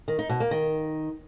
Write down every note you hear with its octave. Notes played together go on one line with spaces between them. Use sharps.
D#3
D#4
B2
A#3
D#3